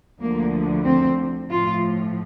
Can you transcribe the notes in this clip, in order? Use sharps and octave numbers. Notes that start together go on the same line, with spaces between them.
D2 D3 F3 A#3
C4
A2 F3 F4